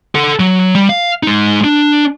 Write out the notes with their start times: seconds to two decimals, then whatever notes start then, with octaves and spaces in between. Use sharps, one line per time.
0.15 A4 F#5
0.40 F#3
0.75 G3
0.89 F5
1.23 G#3 D#4
1.64 D4